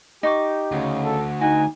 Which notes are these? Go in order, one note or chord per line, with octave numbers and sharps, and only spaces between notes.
D#4 G4 C#6 D6
D2 C#3
A4
D#4 F#4 G#5